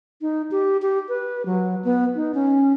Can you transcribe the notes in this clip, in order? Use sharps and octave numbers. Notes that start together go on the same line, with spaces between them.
D#4
G4
G4
B4
F#3
B3
D#4
C#4